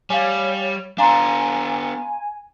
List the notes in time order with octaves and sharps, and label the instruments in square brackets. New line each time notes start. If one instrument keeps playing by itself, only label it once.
[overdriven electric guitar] G3 [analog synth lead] C#5 [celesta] F5 G#5
[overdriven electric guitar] B3 D4 [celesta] F5 A#5 C6 [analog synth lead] G#5